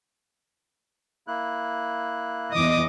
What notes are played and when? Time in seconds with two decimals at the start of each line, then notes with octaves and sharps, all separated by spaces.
1.27 A#3 E4 F#6
2.53 E2 E3 D#5 D6 D#6